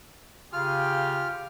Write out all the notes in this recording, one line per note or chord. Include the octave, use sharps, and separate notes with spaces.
C#3 F4 G4 G#4 F6